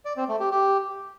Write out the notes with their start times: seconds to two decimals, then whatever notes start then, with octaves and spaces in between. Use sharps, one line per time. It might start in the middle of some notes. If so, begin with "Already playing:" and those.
0.05 D5
0.17 C4
0.28 A3
0.40 G4
0.52 G4